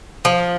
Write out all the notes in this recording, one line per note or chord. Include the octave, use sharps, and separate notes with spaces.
F3